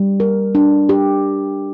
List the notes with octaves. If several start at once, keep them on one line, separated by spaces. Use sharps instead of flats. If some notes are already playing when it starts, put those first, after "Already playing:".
Already playing: G3
A#4
D4
G4